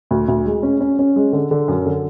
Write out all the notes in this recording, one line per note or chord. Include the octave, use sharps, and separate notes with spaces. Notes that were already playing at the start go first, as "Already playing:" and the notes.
D2
D2
G#3
C#4
C#4
C#4
G#3
D3
D3
F#2
D3